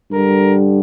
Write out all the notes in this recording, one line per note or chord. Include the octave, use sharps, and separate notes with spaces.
G2 D3 G3 A#4